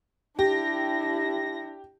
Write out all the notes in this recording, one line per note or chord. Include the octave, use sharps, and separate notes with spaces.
D4 E4 G4 A#6